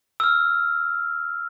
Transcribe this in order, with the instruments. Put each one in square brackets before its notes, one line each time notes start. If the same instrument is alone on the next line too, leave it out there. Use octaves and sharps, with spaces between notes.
[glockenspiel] E6 F6